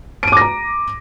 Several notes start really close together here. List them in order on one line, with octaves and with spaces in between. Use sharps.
D7 D#7 D6 A#6 A#5